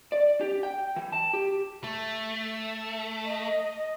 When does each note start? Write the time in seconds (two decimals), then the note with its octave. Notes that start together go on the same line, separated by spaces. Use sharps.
0.12 D5
0.41 G4
0.63 G5
0.96 E3
1.12 A5
1.33 G4
1.84 A3
3.25 D#5